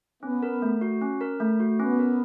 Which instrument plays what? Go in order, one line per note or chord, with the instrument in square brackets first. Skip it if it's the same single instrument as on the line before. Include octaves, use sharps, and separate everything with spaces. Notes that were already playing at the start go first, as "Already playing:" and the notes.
[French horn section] B3 [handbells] C#4
[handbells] A#4
A3
F#4
C#4
A#4
A3
F#4
[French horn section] B3 [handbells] C#4
[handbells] A#4